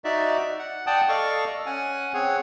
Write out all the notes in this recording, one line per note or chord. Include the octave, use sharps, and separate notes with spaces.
D#4 F#4 D5 E5
F#5
D5 F#5 G5 A5 D#6
A4 D5 D#5 F5 C#6
C#4 F#5 G#5
C4 G#4 C#5 F#5